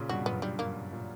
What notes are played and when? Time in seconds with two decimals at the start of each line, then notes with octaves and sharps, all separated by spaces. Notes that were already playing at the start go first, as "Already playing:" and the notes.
Already playing: A#2 C#3
0.09 G2 B2 F#4
0.25 F#2 A#2 B3
0.42 G2 G3
0.59 G2 A#3
0.93 A#2